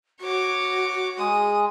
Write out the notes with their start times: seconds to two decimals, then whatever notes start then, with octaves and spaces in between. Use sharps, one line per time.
0.21 F#4 C#5 D6
1.18 G#3 G#4 D#6